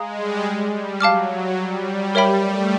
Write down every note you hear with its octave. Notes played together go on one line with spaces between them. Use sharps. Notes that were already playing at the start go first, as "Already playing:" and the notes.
Already playing: G#3 F5 A#5 D#6
G3
G3
F#3 F5 A5 D6 F6
G3
A#4 C#5 E5 G5 B5
A3